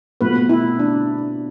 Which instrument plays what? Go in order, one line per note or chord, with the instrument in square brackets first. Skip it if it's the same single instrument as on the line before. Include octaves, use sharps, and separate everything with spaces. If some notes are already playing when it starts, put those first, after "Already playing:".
[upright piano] B2 A3 C4 F4 [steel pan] B4
[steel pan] E4
D4